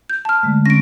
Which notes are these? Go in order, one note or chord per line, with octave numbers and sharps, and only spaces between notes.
G6
A5 F6
D3 G#3 A3
D3 C4 C#4 A#6 D7